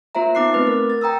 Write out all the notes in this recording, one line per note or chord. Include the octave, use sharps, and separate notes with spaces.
A#3 F4 C5 E5 A#5
B3 D#4 D6 F#6 C7
A3 C4 B4 D6 A6
A#4
A6
G5 A#5 D#6 E6